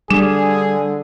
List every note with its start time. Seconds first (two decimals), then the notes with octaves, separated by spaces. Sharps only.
0.10 D3 G3 D4 G#4